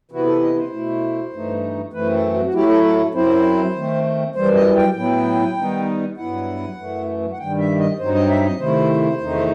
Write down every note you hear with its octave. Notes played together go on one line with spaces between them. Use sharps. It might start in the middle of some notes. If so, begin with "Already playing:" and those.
C3 E3 B3 E4 F#4
A4
D#5
C5
B2 A3 E4
G2 E3 A3 D#4
F#2 E3 A3 C4 B4
A4
F#4
F#4
A2 F#3 A3 E4 G4
A4
A4
F#2 F#3 C4 E4 C5
D#3 A3 C4
F#2 E3 G3 C5
D#5
G5
A2 F#3 B3 E4 G5
D#3 G3 B3 D#4
G2 F#3 B3 E4 F#5
F#2 E3 A3
F#5
G2 D#3 G3 G5
E5
D#5
G2 F#3 C4 D#4 C5
D#5
E5
D#5
C3 D#3 A3 E4 C5
E2 C3 D#3 A3 D#4